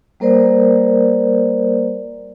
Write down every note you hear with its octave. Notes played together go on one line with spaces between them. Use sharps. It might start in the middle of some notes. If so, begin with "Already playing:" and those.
G3 A#3 A#4 C5 D5